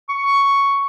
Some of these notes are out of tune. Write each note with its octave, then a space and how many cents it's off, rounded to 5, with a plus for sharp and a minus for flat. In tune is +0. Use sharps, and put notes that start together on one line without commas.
C#6 +5